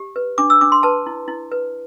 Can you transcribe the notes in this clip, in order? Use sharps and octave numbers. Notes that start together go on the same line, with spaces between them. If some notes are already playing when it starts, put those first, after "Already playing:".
Already playing: G4
B4
D4 D6
E6
D4 D6
C6
B4 A5
E4
E4
B4